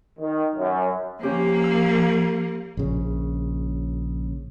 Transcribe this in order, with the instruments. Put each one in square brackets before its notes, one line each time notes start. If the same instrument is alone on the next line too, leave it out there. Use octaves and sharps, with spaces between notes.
[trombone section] D#3
F#2
[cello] F3 A#3 [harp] C#4 G4 C5
[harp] E6
[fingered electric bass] A#1 C#3